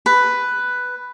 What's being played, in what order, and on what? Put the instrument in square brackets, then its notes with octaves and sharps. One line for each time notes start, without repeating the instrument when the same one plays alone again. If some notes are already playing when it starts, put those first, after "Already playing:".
[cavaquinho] B4